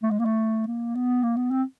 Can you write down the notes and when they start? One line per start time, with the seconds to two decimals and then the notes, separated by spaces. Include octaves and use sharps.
0.03 A3
0.11 G#3
0.19 A#3
0.25 A3
0.67 A#3
0.95 B3
1.23 A#3
1.36 B3
1.51 C4